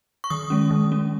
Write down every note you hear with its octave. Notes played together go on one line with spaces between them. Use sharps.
C#6
D#3 D#6
G#3 C#4
D#3
G#3 C#4